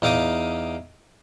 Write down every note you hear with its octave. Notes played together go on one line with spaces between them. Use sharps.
E2 D#4 F5 D6 D#6